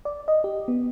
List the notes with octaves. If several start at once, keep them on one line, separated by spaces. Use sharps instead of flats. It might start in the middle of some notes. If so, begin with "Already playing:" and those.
D5
D#5
G4
B3